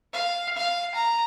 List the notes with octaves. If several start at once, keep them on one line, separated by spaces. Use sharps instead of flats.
F5
F5
A#5